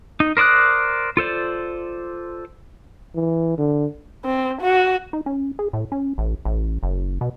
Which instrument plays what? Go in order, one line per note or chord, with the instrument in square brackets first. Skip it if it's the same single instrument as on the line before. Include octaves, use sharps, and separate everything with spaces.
[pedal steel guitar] D#4
A#4 C5 D5 D#6 F#6
F4 A4 C5 D5
[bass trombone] E3
D3
[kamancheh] C4
F#4
[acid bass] D#4
C#4
G#4
A2
C#4
A1
A1
F#1
B2